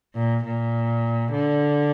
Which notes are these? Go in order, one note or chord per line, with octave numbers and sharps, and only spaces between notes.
A#2
A#2
D3